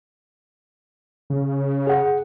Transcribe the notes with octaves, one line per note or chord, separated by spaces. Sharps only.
C#3
G#4 F#5